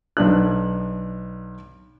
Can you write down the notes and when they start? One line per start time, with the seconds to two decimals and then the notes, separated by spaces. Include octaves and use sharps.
0.17 B1 D4 F#6